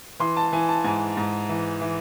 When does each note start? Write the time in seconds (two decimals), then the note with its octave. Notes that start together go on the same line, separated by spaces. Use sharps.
0.19 E3 C6
0.36 A5
0.52 E3 G#5
0.69 A5
0.84 G#2 G#5
1.17 G#2
1.49 E3
1.81 E3